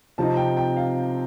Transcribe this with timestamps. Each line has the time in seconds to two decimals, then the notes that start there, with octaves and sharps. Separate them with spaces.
0.18 C3 F3 C4 D#4 A5
0.37 G5
0.57 G5
0.76 F5